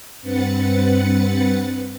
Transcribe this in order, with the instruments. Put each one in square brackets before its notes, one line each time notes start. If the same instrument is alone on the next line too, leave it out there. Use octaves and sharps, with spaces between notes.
[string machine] G2 C4 B4 F#5 A6 C#7